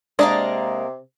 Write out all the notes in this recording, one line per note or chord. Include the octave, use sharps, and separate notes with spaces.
C3 G#3 A#3 D4 A#4 D5 D#5